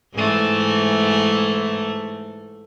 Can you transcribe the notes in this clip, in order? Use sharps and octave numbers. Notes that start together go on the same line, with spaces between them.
G#2 E3 A3